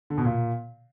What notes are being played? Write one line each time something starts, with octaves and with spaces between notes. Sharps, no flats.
D3
B2
A#2